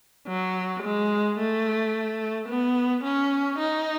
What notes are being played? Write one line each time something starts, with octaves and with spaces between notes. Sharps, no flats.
F#3
G#3
A3
B3
C#4
D#4